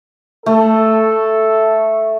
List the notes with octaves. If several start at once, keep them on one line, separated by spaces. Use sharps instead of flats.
A3 A4